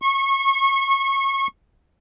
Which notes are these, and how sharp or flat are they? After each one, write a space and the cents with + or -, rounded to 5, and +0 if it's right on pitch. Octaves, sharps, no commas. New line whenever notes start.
C#6 -25